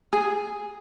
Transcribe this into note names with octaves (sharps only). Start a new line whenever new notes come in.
G#4